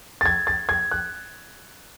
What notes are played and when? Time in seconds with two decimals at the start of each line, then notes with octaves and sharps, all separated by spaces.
0.21 A6
0.26 G#6
0.47 A6
0.69 G#6
0.91 F#6